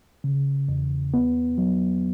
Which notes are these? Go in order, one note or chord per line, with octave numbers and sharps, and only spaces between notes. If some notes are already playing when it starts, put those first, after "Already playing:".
C#3
E2
B3
F#3